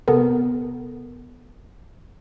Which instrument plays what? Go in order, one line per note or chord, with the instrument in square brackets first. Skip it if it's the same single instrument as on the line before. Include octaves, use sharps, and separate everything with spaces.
[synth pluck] C3 B3 A4 A#4